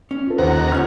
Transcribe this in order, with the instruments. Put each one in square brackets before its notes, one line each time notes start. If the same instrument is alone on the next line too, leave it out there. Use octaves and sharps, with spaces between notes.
[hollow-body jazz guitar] C#4
[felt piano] F4 A4
[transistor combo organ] D#2 F#5 A#5 [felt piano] D#3 C5
[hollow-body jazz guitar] C#2 C#4 C#5 [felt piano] F4 F6